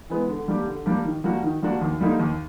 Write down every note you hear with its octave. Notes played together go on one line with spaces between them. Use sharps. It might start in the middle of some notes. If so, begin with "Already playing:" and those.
E3 G#3 B3
D3
G3 A#3 D4 G4
D3
G3 A#3 D4 G4
D#3
G3 A#3 D4 F#4
D#3
G3 A#3 D4 F#4
D#2
D3 G3 A#3 D#4
D#2